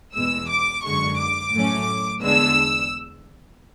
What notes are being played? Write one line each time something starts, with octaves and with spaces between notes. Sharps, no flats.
E2 B2 G#3 E6
D6
F#2 D3 G#3 C#6
D6
A2 F#3 A3 C#4
E2 D3 G#3 B3 D4 E6